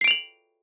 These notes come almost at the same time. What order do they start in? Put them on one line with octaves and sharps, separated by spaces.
C7 D7 F7 F#7